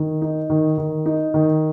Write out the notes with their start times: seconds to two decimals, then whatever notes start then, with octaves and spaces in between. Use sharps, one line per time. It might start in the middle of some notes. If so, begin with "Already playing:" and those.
Already playing: D#3
0.22 D#4
0.50 D#3
0.78 D#3
1.06 D#4
1.34 D#3